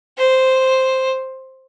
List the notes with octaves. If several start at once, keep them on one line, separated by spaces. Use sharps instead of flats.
C5